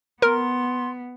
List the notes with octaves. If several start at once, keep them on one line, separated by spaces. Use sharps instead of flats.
B3 A#4 C6